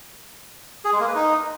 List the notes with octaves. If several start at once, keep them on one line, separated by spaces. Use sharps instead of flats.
G#4
G#3
A#3
B4
D#4